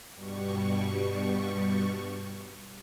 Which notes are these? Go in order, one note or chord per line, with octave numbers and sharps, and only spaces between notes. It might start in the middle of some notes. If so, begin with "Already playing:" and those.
G2 B2 G3 C#6